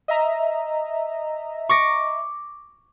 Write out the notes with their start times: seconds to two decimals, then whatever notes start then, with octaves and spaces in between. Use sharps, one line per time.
0.08 D#5 E5 A#5
1.69 C#6 D6 A#6